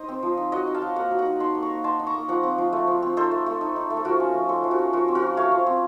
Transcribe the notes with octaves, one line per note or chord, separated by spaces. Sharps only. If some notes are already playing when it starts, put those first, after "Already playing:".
Already playing: D#4 C5 D#5
C4
F3
D#4
F#3 D#5 F#5
D#4
F5 A5
F#3
A#3 F#5 A#5
F#3
F#5 A#5
D#4
D#4 A5 C6
A#3
A#5 C#6
A#3
D#4 A5 C6
D#4
A#5 C#6
A#3
F3 F#5 A#5
C4
F3
A3
F3
C4
D#4 A4 C5
A3
A3
D#4
D#4
A3
A4
F3 F#4 A#4
C#4
F3
A3 A4 C5
F3
F#4 A#4
C#4
F3 F#4 A#4
C4
F#4 A#4
F3
A3 C#5 F5
F3
C4